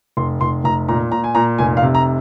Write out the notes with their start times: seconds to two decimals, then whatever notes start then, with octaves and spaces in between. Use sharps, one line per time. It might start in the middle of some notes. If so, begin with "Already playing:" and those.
0.17 F1 C6
0.41 F1 C6
0.64 F1 A#5
0.88 A#2 A#5
1.11 A#2 A#5
1.24 G#5
1.35 A#2 A#5
1.58 F1 G#5
1.77 F5
1.83 C3
1.95 A#5